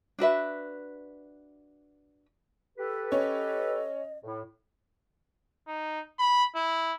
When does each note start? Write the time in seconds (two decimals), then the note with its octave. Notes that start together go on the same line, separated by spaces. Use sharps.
0.19 D4 F#4 B4 E5
2.78 G4 A4 B4
3.12 C#4 C#5 D#5
4.24 A2
5.67 D#4
6.19 B5
6.55 E4